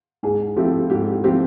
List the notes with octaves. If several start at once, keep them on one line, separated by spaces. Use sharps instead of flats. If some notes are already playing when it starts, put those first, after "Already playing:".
G#2 G#4
F3 A3 C4 E4 G4
G#2 G4
F3 A3 C4 E4 G4